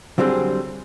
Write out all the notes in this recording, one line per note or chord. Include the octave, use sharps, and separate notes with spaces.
D3 F#3 G3 C4 G#4